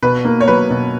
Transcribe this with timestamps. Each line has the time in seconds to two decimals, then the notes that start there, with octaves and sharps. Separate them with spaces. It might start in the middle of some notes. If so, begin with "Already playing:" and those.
0.03 B2 B4
0.25 A#3
0.41 C#5
0.48 F#3 B4
0.70 B2